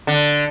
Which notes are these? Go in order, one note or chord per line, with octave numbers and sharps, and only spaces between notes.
D3